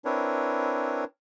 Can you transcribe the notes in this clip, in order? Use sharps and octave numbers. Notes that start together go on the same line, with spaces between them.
C4 D4 E4 A#4 B4 C#5